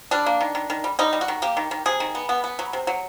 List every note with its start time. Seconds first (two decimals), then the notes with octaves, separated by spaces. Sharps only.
0.11 G3 D4
0.26 A#3
0.41 D#3
0.55 D#3
0.70 D#3
0.84 G3
0.99 G3 D#4
1.13 G3
1.21 F#4
1.28 D#3
1.42 A#3 G4
1.57 D#3
1.71 D#3
1.86 C3 G#4
2.00 D#3
2.15 B3
2.29 B3
2.44 B3
2.59 F#3
2.73 C3
2.87 F#3